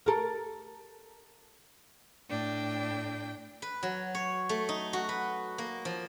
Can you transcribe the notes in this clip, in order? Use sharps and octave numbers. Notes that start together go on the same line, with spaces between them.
A4 A#4
A2 D4 G5
B4
F#3
C#5
A3
D#4
F#4
B4
A#3
F3